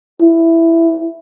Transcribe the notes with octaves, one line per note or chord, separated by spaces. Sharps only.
E4